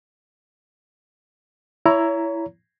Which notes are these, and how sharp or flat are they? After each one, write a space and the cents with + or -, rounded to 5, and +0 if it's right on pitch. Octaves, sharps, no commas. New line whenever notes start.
E4 +10 C#5 +25 A#5 +0